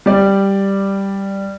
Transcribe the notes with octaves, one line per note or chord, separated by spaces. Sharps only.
G3 D5